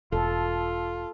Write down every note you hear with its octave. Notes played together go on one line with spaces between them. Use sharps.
E1 F4 A4